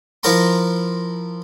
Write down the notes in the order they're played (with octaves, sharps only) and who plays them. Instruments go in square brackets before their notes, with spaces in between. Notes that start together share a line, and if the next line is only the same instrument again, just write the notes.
[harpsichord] F3 E4 A#4 F5 A#5 C6